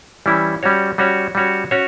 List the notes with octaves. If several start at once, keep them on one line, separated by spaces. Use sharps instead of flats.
E3 G3 C#4 E4
G3 C#4 F#4 C#5
G3 C#4 F#4 C#5
G3 C#4 F#4 C#5
C#4 F#4 C#5